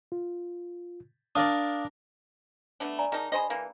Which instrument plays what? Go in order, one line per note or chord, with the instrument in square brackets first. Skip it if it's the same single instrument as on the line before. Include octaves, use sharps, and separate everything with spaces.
[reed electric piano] F4
[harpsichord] D4 A#4 D5 [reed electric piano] F5 D#6
[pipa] A3 B3 D4
[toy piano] D5 G#5 A#5
[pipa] D#3 D#4 [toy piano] G#4 A5
[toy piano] D4 B5 [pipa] G#4 C5 D#5
[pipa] E3 A#3